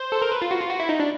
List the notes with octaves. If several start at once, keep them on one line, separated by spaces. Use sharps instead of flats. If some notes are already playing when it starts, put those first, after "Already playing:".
Already playing: C5
A4
A#4
B4
F4
F#4
F4
F#4
E4
D#4
D4